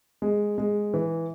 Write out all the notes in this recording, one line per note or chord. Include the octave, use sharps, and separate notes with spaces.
G#3
G#3
E3